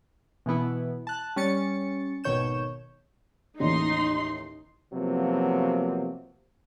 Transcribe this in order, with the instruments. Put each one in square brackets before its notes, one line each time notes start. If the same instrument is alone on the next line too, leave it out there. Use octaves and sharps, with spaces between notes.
[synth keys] B2 E3 B3 E4
A5 F#6
G3 C#4 A6 C#7
G#1 B2 D#3 C#5 G6 E7
[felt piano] A1 D#2 A2 [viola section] D#4 C6
[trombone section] C3 F3 F#3 A#3 B3